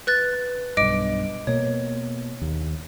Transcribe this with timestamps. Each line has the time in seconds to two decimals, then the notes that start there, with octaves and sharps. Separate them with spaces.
0.07 B4 F#6 A6
0.77 B1 G2 D#5 D6 D7
1.47 B2 A#3 C#5
2.42 D#2